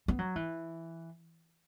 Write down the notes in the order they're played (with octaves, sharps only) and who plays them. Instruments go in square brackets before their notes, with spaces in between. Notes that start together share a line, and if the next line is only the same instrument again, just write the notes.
[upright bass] B3
F#3
E3